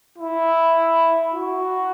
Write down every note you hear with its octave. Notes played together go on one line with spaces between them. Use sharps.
E4
F#4